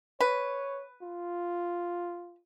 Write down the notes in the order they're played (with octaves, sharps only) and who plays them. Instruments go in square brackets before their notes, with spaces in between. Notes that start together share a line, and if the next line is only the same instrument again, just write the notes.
[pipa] B4 [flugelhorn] C#5
[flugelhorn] F4